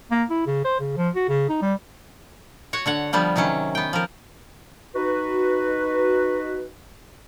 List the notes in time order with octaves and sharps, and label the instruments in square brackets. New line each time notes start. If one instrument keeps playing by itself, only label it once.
[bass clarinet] A#3
E4
C#3
C5
C#3
F3
F#4
C#3
D#4
G3
[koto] F#4 C#5 F#5
D3 C#5 F#5
D3 F3 G3 B3
C3 D#3 F#3 C#4
B3 G5
F3 A#4
[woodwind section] D#4 F#4 B4